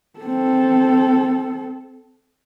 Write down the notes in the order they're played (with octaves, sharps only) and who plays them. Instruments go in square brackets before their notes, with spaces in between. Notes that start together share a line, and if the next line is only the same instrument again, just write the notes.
[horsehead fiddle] C4 A4